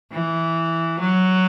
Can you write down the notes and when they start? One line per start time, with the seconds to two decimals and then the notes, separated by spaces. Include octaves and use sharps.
0.12 E3
1.00 F#3